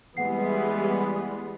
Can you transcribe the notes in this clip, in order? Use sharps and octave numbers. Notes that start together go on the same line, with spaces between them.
E3 G3 G#3 B3 F#5 C7